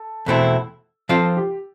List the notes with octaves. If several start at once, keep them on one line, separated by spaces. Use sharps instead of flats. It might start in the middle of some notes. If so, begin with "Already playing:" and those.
Already playing: A4
E2 B2 A3 C4 E4
F3 C4 F4 A4 C5 F5
G4